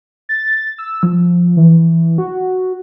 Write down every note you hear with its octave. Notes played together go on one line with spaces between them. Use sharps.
A6
E6
F3
E3
F#4